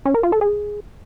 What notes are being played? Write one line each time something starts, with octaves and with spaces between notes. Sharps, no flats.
C#4
A#4
F4
A4
G#4